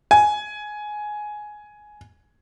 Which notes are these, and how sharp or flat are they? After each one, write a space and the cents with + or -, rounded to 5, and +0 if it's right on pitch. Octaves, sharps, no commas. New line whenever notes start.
G#5 +10